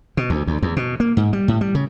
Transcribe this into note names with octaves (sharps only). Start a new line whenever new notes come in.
B2
D2
D2
E2
B2
A#3
G#2
G3
A2
G3
C#3